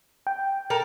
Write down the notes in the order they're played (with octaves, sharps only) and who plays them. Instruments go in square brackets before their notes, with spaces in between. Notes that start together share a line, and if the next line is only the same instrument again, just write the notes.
[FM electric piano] G5
[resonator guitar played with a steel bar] A4 A#4